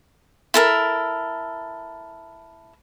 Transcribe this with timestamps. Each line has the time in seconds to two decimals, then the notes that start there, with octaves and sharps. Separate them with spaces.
0.54 E4 A4 A#4